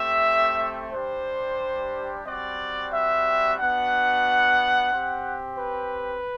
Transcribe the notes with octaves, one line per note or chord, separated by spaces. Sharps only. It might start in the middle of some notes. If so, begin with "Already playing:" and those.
Already playing: A3 C4 G4 E5
G3 D4 G4 C5
G3 C4 F#4 D5
E5
B3 D4 F#4 F#5
C4
G4
B4